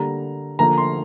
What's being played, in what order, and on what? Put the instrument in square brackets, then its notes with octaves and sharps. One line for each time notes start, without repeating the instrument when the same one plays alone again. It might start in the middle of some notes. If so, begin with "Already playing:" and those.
Already playing: [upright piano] D3 G3 A#3 A#5
D3 F3 A#3 A#5
C6